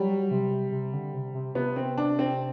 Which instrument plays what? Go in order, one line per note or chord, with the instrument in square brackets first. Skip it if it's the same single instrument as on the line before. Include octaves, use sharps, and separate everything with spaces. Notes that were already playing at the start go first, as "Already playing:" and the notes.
Already playing: [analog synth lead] F#3 [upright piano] G3
[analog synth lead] C3
C3
D3
C3
C3
[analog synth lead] C3 [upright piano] B3
[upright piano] C4
D4
C4